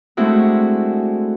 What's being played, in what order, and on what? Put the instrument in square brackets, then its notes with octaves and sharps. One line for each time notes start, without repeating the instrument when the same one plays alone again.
[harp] G#3 A3 C4 D4 E4 F#4